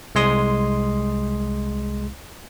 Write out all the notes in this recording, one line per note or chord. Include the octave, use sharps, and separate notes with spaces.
C2 G#3 C6 D#6